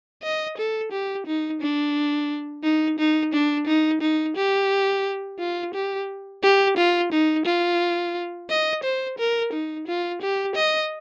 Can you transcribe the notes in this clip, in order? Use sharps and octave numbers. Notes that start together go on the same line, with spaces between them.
D#5
A4
G4
D#4
D4
D#4
D#4
D4
D#4
D#4
G4
F4
G4
G4
F4
D#4
F4
D#5
C5
A#4
D#4
F4
G4
D#5